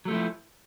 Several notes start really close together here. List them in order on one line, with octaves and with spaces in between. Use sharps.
F#3 A3 F3 E4